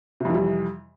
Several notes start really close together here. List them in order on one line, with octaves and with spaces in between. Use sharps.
C3 F2 E3 G3